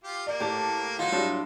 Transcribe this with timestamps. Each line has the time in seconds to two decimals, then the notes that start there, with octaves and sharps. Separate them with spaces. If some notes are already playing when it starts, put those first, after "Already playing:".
0.04 F4 G4
0.27 A#3 D5
0.40 A2 G4 A4
0.99 F#3 D#4 F4
1.12 A2 F#3 G3 D4 F4